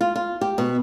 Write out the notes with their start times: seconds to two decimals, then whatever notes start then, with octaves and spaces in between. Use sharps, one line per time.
0.01 F4
0.16 F4
0.41 G4
0.58 B2